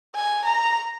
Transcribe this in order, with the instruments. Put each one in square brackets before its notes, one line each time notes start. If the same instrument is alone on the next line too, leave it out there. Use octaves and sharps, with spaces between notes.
[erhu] G#5
A#5